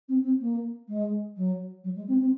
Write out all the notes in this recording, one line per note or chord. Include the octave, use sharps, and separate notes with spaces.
C4
C4
A#3
G#3
F#3
F#3
G#3
C4
C4